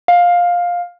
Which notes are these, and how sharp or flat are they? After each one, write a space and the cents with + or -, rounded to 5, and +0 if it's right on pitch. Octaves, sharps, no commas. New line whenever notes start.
F5 +15